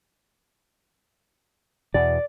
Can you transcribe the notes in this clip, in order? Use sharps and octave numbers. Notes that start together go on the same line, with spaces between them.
E2 B2 D5